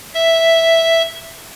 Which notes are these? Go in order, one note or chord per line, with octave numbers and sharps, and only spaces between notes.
E5